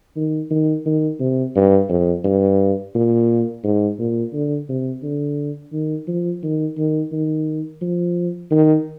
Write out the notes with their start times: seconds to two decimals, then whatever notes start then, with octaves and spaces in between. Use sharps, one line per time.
0.16 D#3
0.51 D#3
0.86 D#3
1.20 C3
1.56 G2
1.90 F2
2.25 G2
2.95 A#2
3.64 G#2
4.00 A#2
4.33 D3
4.69 C3
5.03 D3
5.73 D#3
6.08 F3
6.43 D#3
6.78 D#3
7.12 D#3
7.82 F3
8.51 D#3